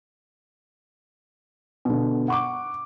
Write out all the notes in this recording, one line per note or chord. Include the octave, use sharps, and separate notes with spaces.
B2 D3
F#5 C#6 D6